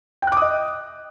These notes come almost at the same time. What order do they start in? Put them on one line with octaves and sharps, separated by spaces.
G5 F#6 D6 D#6 D#5